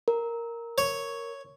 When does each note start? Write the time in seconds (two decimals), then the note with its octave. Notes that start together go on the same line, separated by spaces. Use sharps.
0.08 A#4
0.78 C#5